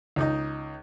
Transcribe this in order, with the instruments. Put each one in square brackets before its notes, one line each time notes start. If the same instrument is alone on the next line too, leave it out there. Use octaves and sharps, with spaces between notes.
[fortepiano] C#2 D#4 D#5